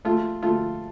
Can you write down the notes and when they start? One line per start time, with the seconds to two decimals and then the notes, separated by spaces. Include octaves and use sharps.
0.05 A3 F4
0.43 A3 F4